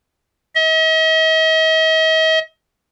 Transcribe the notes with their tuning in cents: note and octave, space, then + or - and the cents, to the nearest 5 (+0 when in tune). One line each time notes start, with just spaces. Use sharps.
D#5 +45